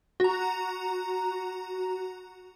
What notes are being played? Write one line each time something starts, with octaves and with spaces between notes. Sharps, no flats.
F#4 A#5